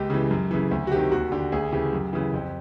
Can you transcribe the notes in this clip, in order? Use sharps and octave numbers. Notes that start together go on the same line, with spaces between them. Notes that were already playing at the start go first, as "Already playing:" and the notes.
Already playing: C#2 G4
C#3 E3
F#2
C#3 E3
D2
F#4
C3 D#3 G4
D#2 F#4
D3 G4
D2 G#4
C#3 E3 G4
F#2
C#3 E3
F2